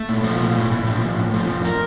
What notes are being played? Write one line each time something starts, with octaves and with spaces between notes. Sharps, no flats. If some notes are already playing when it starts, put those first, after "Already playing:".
Already playing: A3
A#2
F3
A#2
A2
A2
F3
A2
A2
F3
F2
A#4